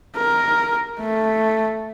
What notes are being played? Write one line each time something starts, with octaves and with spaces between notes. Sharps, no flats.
A#4
A3